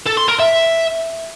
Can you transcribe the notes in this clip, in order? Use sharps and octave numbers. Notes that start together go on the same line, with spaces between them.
A4
C6
A#4
E5